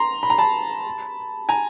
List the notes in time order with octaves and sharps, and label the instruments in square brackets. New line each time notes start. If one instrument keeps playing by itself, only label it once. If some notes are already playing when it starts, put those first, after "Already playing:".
Already playing: [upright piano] A#5 C6
B5
A#5
A5 B5
G#5 A#5